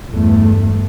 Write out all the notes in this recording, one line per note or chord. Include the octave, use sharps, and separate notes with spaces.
E2 G2 A3